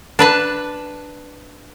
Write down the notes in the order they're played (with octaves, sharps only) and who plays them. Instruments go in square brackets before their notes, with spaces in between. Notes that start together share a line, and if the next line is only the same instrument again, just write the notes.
[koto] D4 B4 A5